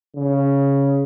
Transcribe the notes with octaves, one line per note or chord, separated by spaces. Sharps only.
C#3